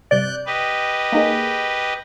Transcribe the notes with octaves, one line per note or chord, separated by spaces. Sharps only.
G2 C3 D5 F#6 G6
G4 B4 D#5
A#3 D#4 G#4